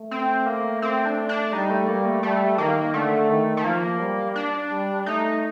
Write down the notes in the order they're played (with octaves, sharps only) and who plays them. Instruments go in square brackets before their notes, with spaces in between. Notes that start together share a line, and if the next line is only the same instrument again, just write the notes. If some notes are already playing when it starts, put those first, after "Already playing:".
Already playing: [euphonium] A3
[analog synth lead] C4
A#3
C4
D4
D4
[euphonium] G3 [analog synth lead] D#4
[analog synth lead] A3
[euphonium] G3 [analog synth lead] A#3
[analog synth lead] A3
[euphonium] G3 [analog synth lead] A3
[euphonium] D#3 [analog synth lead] A#3
[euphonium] D3 [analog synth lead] A3
[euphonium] D#3
[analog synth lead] A3
[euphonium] F3 [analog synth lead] A#3
[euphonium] G3
[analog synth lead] D4
[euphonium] G3
[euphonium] A3 [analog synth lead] D#4